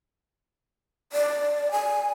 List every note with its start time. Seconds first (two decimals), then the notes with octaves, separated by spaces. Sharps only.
1.13 D5
1.72 G#5